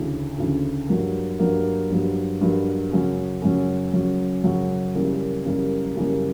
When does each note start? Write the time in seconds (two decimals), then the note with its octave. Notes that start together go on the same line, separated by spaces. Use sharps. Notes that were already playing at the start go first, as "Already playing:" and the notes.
Already playing: D2 C#3 E3
0.38 D2 C#3 E3
0.89 G2 F#3 A#3
1.39 G2 F#3 A#3
1.90 G2 F#3 A#3
2.41 G2 F#3 A#3
2.92 F#2 C#3 F#3 C#4
3.42 F#2 C#3 F#3 C#4
3.93 F#2 C#3 F#3 C#4
4.44 F#2 C#3 F#3 C#4
4.94 F#2 C#3 E3 G3 A#3
5.45 F#2 C#3 E3 G3 A#3
5.96 F#2 C#3 E3 G3 A#3